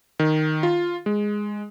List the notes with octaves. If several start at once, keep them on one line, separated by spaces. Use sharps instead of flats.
D#3
F4
G#3